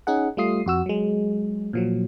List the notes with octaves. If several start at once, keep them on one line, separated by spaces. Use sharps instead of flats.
C#4 D#4 G#4 F#5
G3 A3 F4 D#6 C7
F2 F#4 E6
F#3 G#3
A#2 F3 F#3